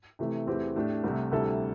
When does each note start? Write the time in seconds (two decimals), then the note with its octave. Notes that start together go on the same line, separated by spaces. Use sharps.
0.19 C3 E3 A3
0.47 E2 E3 A3 C4 G4
0.76 A2 A3 D4 G4
1.04 C2 C3 A3
1.32 D2 C3 G3 E4 A4